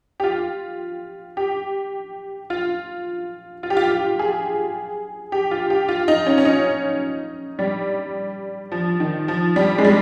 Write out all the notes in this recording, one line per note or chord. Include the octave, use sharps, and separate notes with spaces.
G4
F4
G4
F4
F4
G4
F4
F4
G#4
G4
F4
G4
F4
D#4
C#4
C#4
D#4
G3
F3
D#3
F3
G3
G#3
G3